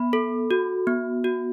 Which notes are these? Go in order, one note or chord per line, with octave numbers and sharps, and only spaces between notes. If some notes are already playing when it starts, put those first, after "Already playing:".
Already playing: B3 B5
A4
F#4
B3
F#4